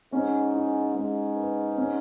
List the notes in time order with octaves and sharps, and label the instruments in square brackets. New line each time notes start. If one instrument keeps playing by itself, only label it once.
[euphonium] G#2 [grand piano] C#4
[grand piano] E4
[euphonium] G#2 [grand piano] G#3
[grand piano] B4
C#4